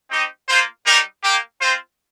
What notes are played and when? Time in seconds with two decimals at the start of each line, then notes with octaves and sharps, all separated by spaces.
0.11 C4 D#4 G4 D#5
0.48 A#3 F4 C5
0.86 G3 D#4 G4 A#4
1.23 A#3 G4
1.61 C4 F4 C5